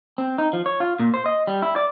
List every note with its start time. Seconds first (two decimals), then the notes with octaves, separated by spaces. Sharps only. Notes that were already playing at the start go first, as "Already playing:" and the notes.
0.18 C4
0.38 D#4
0.53 F3
0.66 C#5
0.80 F4
0.99 A#2
1.14 C5
1.26 D#5
1.47 G3
1.62 E4
1.76 D5